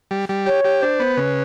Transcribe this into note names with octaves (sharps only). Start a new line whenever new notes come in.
G3
G3
G4 C#5
G4
D4 C5
B3
C#3 B4